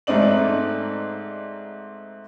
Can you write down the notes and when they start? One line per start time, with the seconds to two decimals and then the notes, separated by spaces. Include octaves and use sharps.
0.07 G#2 A3 C4 D#4 D5 F#7